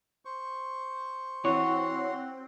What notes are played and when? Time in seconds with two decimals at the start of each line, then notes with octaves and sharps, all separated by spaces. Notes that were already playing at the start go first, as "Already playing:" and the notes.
0.25 C5 C#6
1.45 E3 C4 F#4 C#5 F#5 C6